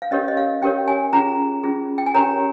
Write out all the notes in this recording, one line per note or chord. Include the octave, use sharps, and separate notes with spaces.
F5
C#4 G4 A#4 C#5 D#5
D#5
F5
C#4 G4 A#4 C#5 G5
G#5
C#4 F4 G#4 A#5
C#4 F4 G#4
G5
G#5
C#4 G4 A#4 C#5 A#5